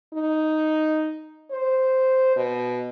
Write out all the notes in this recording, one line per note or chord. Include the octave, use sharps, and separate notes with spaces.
D#4
C5
B2